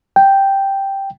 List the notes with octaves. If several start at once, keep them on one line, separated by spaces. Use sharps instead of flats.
G5